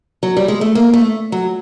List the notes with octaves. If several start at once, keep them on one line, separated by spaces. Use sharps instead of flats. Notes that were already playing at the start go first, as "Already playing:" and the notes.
F#3
G3
G#3
A3
A#3
A3
F#3